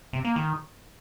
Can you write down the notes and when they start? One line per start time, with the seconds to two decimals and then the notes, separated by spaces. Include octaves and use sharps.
0.13 C3
0.25 A#3
0.36 D#3